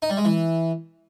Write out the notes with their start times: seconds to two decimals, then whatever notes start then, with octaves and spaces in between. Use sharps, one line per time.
0.02 D#4
0.10 G3
0.17 G#3
0.25 E3